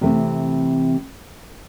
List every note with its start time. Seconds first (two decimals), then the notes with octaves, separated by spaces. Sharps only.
0.01 C3 E3 A3 C4